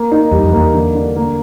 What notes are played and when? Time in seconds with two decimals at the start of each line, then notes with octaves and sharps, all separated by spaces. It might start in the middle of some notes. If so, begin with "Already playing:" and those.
Already playing: A#3
0.12 D#4
0.31 E2 G3
0.43 F2
0.53 E2 A#3
0.74 D3
0.95 D3
1.16 A#3